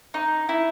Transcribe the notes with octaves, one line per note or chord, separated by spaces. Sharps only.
D#4
E4